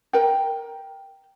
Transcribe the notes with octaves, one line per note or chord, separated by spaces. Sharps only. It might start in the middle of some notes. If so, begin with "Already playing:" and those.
A#4 G5